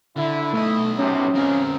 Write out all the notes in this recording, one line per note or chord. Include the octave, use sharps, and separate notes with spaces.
D3 E4
B1 A3 D#5
F#2 A2 C3 C#4
C#2 F#2 C#3 C4 A#4